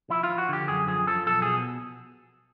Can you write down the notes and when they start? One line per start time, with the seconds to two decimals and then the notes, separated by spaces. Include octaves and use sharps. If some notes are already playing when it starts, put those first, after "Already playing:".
0.10 F3 E4
0.23 F4
0.29 F3
0.38 F#4
0.49 D3 G4
0.68 F#2 G#4
0.87 F3 G#4
1.07 F3 A4
1.26 B1 A4
1.42 B2 G#4